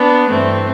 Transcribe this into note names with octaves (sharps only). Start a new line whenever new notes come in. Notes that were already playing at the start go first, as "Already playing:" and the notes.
Already playing: B3 D4
G2 E3 A3 C4